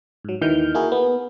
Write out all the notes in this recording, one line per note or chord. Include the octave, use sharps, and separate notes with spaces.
G#2 F#3
D#2 D#3 E3 F6 G6
A#3 E4 F#4 G#4 A#4
B3